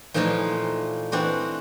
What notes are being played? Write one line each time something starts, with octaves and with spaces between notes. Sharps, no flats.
A#2 E3 F3 A3 D#4 F4
E3 C4 D4 F#4